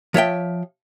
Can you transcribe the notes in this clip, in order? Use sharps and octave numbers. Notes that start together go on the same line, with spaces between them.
F3 C#5 E5 G5